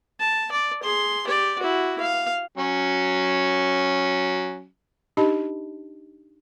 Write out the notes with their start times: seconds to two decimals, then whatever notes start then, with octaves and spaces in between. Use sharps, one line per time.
0.20 A5
0.52 D5
0.83 G#4 C6
1.26 G4 D5
1.59 E4 F#4
2.00 F5
2.58 F#3 C#4
5.17 D4 D#4 G4 D#5 A5 B5